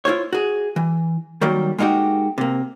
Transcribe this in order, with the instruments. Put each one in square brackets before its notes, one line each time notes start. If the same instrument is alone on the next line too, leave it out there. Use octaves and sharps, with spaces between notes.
[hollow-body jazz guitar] E4 F4 C5 C#5
F#4 G#4
E3
D#3 F#3 G3 A#3
G#3 A#3 D#4 F#4 G4
C3 A#3